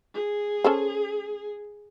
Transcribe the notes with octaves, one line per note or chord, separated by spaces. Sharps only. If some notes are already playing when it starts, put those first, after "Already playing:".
G#4
C#4 A4 C5